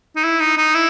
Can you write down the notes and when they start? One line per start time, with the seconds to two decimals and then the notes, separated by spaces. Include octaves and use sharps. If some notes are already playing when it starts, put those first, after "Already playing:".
0.16 D#4
0.23 E4
0.40 D#4
0.57 D#4
0.74 E4